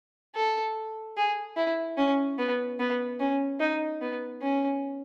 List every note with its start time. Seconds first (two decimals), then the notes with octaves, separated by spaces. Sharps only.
0.35 A4
1.17 G#4
1.57 E4
1.97 C#4
2.38 B3
2.79 B3
3.20 C#4
3.60 D#4
4.01 B3
4.42 C#4